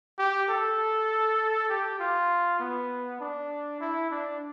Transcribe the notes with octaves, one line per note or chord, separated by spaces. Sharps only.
G4
A4
G4
F4
B3
D4
E4
D4